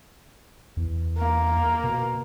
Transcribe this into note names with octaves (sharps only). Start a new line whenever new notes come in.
E2
A#3
B2